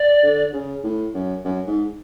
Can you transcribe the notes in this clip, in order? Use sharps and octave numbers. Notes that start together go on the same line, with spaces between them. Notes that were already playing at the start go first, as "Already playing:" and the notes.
Already playing: D5
D3
C#3
A2
F#2
F#2
G#2